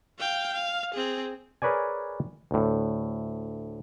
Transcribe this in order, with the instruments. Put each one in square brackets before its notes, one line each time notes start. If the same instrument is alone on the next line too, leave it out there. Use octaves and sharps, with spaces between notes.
[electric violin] F5 G5
F5
C4 G#4
[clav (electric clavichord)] G#4 A#4 B4 C#5 D5 G#5
D2 A2